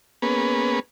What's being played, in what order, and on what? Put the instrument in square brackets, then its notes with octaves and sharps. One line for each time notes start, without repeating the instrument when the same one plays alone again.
[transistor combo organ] A#3 B3 C#4 G#4 B4